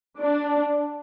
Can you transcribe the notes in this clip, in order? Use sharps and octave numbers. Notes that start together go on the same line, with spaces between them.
D4